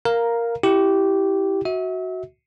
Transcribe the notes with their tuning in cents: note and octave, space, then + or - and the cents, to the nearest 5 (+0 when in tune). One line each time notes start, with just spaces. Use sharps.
A#4 +0 F5 +0 A#5 +5
E4 +0 G4 -10
F#4 +0 E5 -35